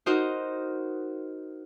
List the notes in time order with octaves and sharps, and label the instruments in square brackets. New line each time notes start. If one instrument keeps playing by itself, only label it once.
[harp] D#4 F#4 A#4 C5 D#5